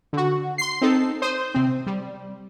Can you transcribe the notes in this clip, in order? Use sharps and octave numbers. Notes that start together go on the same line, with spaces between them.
D3 F#4
C6 C7
C4 D#4 A4
C5 D#6
C3 C4
G3